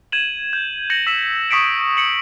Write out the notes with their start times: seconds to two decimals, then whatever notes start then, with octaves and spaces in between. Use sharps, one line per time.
0.12 G#6 D#7 E7 F#7
0.53 G6
0.90 G6 A#6 C#7 F#7
1.07 E6 B6 E7 F#7
1.51 C#6 D#6 B6 C#7 D7
1.97 C#7 F#7